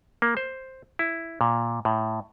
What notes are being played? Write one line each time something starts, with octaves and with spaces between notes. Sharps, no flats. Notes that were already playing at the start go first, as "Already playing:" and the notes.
A#3
C5
E4
A#2
A2